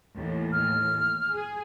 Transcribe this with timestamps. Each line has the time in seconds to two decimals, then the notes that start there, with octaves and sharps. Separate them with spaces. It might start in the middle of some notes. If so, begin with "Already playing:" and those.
0.15 D#2 A2 E3
0.52 F6
1.32 G#4